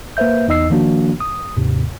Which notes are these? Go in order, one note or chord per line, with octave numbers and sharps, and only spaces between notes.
A#3 B4 C5 E5 G6
E2 D#4 D#5 E6 C7
D#3 F3 A#3 D4 F#4
D#6
D#2 G#2 C3